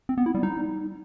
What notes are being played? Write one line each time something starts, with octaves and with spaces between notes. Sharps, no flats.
C4
B3
E4
G3
D#4